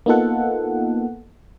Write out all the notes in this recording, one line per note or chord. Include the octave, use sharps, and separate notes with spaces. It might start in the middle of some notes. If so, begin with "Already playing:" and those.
A#3 B3 D#4 F4 A4 F#5